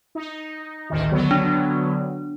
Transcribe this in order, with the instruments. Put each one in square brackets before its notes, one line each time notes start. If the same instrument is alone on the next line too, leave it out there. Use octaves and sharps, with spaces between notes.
[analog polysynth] D#4
A1 D2 D#3
D3 F#3 B3
[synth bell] D4